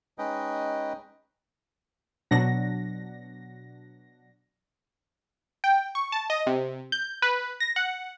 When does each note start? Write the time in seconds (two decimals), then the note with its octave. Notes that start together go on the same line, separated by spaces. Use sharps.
0.18 G#3 C#4 D#4 B4 D#5 G5
2.31 B2 F#3 D4 F#5 A#6
5.64 G5
5.95 C#6
6.12 A5
6.30 D#5
6.47 C3
6.92 G6
7.22 B4
7.60 A#6
7.76 F#5